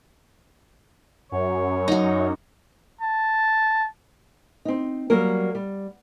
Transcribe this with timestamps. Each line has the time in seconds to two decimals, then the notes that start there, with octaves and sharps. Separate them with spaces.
1.32 F#2 C#5
1.88 D#4 F#4
3.01 A5
4.65 C4 D#4
5.10 F#3 G3 A#3 A#4
5.55 G3